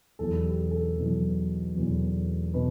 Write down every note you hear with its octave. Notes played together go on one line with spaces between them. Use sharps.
E1 E2 B2 F#3 A4
G4
A4
E1 E2 B2 F#3
E1 E2 B2 F#3
B2 B4